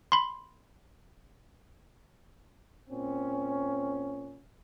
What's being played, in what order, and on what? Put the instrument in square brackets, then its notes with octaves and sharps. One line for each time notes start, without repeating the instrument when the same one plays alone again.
[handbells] B5 C6
[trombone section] A#2 C4 C#4